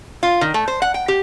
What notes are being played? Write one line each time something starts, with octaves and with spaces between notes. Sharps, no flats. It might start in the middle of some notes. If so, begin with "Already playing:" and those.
F4
D#3
A3
C5
F#5
G5
G4